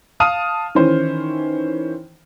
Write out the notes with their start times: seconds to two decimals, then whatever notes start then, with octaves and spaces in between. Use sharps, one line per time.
0.20 F5 A5 D#6 F6 D#7
0.75 D#3 E3 C#4 C5